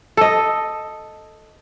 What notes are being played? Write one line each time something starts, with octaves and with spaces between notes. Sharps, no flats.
A4 D#5